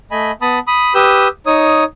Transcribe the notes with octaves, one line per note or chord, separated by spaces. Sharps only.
A3 D#5 G#5 B5
B3 A5 B5 D#6
B5 D#6
G4 B4 D#6 E6 G6
D#4 C#5 D#6